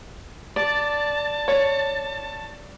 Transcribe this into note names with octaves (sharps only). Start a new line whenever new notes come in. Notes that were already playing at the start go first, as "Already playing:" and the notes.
D5 A5
C#5